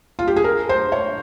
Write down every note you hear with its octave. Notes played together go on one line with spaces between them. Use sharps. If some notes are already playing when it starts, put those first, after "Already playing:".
F4
G4
G#4
A#4
C5
C#5